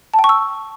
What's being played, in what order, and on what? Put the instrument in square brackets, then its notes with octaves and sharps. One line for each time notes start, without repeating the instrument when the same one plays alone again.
[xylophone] A5
G5
C#6
E6